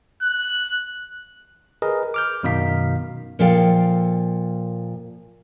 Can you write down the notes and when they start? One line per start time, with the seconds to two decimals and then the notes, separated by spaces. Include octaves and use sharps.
0.22 F#6
1.82 G#4 A#4 B4 D#5
2.14 D6 F6 G6
2.43 F#2 B2 D#3 D#4 F5 B6
3.39 A#2 F3 A4 F5 G5